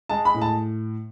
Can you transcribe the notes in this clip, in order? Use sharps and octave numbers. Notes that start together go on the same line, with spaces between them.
G#3 A5
B5
A2
A5